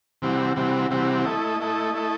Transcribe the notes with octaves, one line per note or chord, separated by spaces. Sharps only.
C3 E3 G3 C4 F#4
C3 E3 G3 C4 F#4
C3 E3 G3 C4 F#4
A3 E4 A4 D#5
A3 E4 A4 D#5
A3 E4 A4 D#5